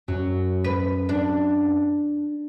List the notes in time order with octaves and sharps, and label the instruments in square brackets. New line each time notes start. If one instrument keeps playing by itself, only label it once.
[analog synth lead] F#2 [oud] F#3
[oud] B4
D4